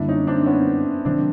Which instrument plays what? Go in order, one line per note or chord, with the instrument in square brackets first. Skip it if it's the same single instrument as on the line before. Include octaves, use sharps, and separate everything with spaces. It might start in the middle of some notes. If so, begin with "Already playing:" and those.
Already playing: [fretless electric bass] F#2 D3 G3 A#3 [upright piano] D4 E4
[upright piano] C#4 D#4
C4 D4
B3 C#4
[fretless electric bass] C3 D#3 F#3 A#3 [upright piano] C4 D4